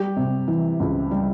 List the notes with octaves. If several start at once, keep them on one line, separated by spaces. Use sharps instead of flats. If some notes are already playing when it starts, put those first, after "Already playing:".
Already playing: G3 G4
C3
E3
C#2
G3